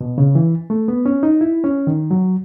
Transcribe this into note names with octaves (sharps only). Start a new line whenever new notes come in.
B2
C#3
E3
A3
B3
C#4
D#4
E4
C#4
D#3
F#3